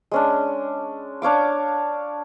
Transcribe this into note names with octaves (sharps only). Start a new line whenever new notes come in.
G#3 C#4 D4
D4 C#5 F5 D6